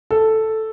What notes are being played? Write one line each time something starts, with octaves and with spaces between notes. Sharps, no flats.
A4